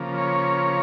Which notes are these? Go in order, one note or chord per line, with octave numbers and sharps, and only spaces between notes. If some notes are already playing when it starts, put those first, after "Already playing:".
Already playing: C#3 F3 A#3
C#5